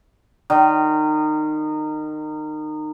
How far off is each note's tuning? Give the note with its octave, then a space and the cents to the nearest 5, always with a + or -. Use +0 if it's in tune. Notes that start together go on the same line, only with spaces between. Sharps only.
D#3 -25